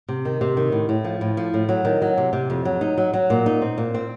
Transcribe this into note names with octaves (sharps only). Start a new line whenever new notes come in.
C3
D#3
C3
D#3
A2
A2
F3
A2
F3
A2
F#3
D#3
F#3
C3
C3
F2
F#3
D#4
F#3
F#3
A#2
D#4
C4
A#2
C4